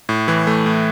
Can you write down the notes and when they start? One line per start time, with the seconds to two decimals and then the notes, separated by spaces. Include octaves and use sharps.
0.09 A2
0.28 E3
0.47 A3
0.66 A2